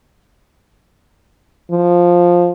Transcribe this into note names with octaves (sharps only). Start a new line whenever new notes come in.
F3